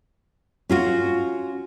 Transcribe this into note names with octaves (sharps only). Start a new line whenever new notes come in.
C#4 F4 F#4